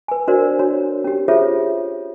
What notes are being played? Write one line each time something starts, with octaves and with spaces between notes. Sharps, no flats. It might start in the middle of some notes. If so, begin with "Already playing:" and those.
B4 G#5
D4 F#4 A#4 C5 D5
D4 F#4 C#5
C#4 G4
F4 G#4 A4 C5 C#5 E5